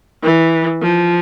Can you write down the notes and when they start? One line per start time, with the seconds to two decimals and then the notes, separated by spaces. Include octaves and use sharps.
0.23 E3
0.82 F3